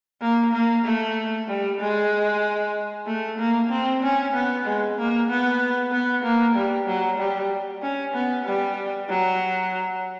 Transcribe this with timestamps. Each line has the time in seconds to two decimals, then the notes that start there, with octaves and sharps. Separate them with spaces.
0.21 A#3
0.53 A#3
0.85 A3
1.48 G3
1.80 G#3
3.06 A3
3.38 A#3
3.70 C4
4.02 C#4
4.33 B3
4.65 G#3
4.97 A#3
5.29 B3
5.92 B3
6.23 A#3
6.55 G3
6.87 F#3
7.18 G3
7.82 C#4
8.14 B3
8.45 G3
9.09 F#3